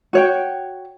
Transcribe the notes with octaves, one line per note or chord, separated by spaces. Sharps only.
F#4 C#5 G5